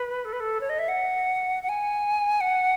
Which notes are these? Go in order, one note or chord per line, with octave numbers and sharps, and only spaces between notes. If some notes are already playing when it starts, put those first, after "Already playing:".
Already playing: B4
A4
B4
A4
C#5
D#5
E5
F#5
F#5
G#5
F#5